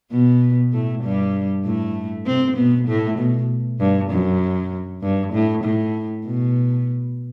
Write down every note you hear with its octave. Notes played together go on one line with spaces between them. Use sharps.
B2 B3
A2 A3
G2 G3
A2 A3
C3 C4
B2 B3
A2 A3
B2
G2
F#2
G2
A2
A2
B2